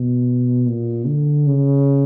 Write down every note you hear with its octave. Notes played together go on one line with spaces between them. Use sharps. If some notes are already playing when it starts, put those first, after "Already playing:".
Already playing: B2
A#2
D3
C#3